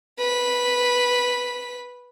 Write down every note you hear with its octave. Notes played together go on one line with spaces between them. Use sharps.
B4 B6